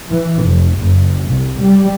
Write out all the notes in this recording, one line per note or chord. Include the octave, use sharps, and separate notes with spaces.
E3
F1
F#1
C2
G3